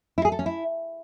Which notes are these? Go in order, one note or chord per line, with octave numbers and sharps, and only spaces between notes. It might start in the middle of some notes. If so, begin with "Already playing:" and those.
E4
G#4
A4
C#4
E4